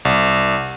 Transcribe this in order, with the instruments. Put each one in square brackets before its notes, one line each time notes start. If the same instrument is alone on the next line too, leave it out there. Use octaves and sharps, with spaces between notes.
[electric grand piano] C2